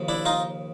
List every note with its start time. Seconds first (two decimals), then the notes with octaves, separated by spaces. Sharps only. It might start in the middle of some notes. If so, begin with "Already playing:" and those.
Already playing: D#2 C#3 F3
0.09 D4 E4
0.25 D#4 F4